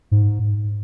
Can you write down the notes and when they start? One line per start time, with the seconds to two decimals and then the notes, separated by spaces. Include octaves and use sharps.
0.11 G#2